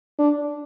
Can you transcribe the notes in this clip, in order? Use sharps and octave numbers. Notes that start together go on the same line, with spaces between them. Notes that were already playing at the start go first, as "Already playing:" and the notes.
D4